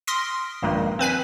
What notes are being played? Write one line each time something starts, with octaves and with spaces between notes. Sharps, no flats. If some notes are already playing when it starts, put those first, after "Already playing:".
C6 D#6 F6 A#6 B6 D7
A#1 G2 D#3 G#3 A#3
C4 B4 G#5 B6